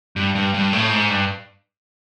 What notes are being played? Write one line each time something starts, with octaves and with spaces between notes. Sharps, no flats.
G2
G2
G2
A2
G#2
G2